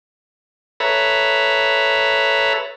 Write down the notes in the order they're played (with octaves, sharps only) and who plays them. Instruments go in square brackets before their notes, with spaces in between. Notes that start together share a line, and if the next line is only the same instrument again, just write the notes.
[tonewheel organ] A4 B4 C#5 E5 A#5 B5